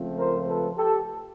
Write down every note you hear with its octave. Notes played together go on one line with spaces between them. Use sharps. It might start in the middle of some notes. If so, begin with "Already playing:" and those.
Already playing: C#2 C#3 F3 A3 C4
A#4 C5
A4 B4
G4 A4